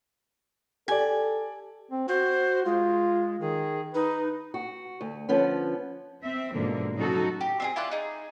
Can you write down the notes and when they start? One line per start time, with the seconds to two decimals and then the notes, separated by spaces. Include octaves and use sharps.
0.88 G4 A4 D5 G#5
1.91 C4
2.08 F#4 C5
2.66 G#3 F4
3.41 D#3 G#4
3.95 D#4 B4
4.54 F#4
5.01 D2
5.29 D3 F3 B3 C#4
6.24 C4 E5
6.55 G#2 B2 D3 F3 A#3
6.96 A2 C#3 F#3 D#4 F#4 A4
7.41 G4
7.60 C4 D4 G#4
7.76 E4 F4 D5 F#6
7.91 D#4 G#4